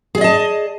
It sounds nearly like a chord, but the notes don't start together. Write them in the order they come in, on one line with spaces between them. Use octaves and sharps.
G#4 D5 D#5 A5